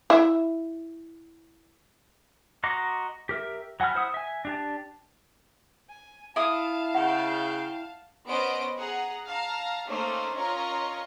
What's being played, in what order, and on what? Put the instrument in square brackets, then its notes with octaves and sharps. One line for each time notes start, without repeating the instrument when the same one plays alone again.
[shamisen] E4 E5
[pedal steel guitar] F#4 D#5 A#5 C6 D6
G4 A#4 E5
F#3 F#5 G#5 B5 F6
E4 C5 F#5 D#6
E5 G#5
D4 G4 A5
[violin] G#5
[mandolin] E4 D#6 [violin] F5 A5
[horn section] C#3 G5 [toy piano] F#5
[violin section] B3 C#4 C5 D#5 D7
G#4 F#5 A#5
F5 A5 A#5
A3 A#3 C#4 D#4 C5
C#4 F4 A#4 C#5 D#5 A#5